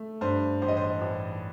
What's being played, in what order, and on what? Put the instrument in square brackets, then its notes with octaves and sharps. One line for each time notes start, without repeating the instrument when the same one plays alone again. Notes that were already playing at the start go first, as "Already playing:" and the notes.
Already playing: [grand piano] A3
G2 C5
A1 C5
D#5
C5
A1